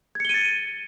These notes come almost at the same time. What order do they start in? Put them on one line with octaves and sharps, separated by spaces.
G#6 C#7 G7 D#7 A6